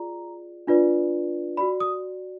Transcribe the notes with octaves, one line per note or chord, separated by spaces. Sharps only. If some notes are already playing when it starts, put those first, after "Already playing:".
Already playing: F4 G#4 D5 A#5
D4 F4 B4 D5
F#4 D5 B5
D#6